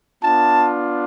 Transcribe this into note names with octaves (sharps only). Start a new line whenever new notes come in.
B3 D4 F4 A5